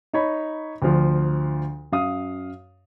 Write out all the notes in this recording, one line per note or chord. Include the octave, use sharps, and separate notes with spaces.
D#4 C#5 B5
D2 F3
F#2 F5 D#6